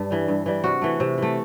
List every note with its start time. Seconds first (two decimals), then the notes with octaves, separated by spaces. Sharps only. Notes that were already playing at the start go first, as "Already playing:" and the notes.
Already playing: G2 D4
0.11 E3 G3
0.28 G2
0.46 E3 G3
0.64 C3 F#4
0.82 E3 A3
1.00 C3
1.18 E3 A3